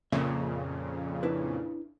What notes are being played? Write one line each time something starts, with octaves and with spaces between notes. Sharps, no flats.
F2 A#2 C#3 E5
D4 E4 B4